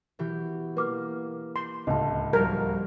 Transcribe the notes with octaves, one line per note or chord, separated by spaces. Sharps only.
B2 E3 G4
A#3 B4 D6 F6
C6
D1 C#2 D#5 A5
F3 G3 F#4 A#4